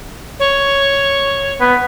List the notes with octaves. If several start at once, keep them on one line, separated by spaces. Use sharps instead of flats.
C#5
B3